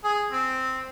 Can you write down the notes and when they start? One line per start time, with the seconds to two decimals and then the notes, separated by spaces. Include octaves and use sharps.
0.04 G#4
0.32 C4